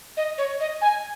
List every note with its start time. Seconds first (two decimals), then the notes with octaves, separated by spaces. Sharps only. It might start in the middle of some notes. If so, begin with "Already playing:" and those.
0.17 D#5
0.38 C#5
0.60 D#5
0.81 G#5